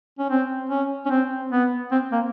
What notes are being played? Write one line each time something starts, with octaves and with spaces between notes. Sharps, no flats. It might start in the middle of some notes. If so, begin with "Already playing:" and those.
C#4
C4
C#4
C#4
C4
B3
C4
A#3